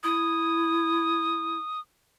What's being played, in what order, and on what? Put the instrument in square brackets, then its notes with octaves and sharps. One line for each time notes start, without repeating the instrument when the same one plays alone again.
[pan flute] E4 [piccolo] D#6